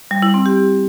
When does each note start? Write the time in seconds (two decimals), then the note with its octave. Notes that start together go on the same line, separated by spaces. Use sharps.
0.11 G3
0.22 E4
0.34 C4
0.46 G4